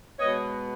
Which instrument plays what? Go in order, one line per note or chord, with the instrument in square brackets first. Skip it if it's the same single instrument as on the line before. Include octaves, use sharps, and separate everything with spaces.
[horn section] B2 G#3 B3 C#5 D#5